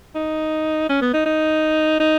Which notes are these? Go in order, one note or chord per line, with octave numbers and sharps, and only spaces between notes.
D#4
C#4
B3
D#4
D#4
D#4